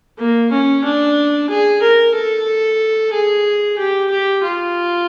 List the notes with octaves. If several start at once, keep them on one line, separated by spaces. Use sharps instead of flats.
A#3
C#4
D4
G#4
A#4
A4
G#4
G4
G4
F4